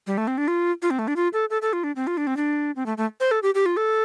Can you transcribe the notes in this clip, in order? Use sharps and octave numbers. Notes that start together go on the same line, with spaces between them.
G3
A3
C4
D4
F4
F4
C4
A3
D4
F4
A4
A4
A4
F4
D4
C4
F4
D4
C4
D4
C4
A3
A3
C5
A4
G4
G4
F4
A4